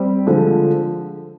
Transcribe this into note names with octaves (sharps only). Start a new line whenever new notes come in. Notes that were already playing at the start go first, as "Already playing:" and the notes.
Already playing: G3 C4 G4
D3 F3 G#3